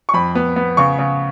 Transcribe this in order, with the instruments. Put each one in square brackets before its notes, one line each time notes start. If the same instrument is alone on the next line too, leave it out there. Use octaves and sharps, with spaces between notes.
[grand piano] C#6
F2 B5
B3
B3
C#3 C#6
C#3